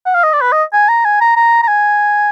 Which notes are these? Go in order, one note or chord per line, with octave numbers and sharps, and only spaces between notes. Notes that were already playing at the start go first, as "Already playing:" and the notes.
F#5
F5
D#5
D5
B4
D#5
G#5
A#5
G#5
A#5
A#5
A#5
G#5